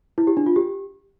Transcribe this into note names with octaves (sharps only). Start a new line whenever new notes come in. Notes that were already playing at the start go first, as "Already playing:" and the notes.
E4
G4
D4
F4
G4